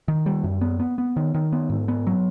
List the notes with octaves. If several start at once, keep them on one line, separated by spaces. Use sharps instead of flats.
D#3
G3
F#2
B3
B3
B3
D#3
D#3
B3
G#2
B3
F#3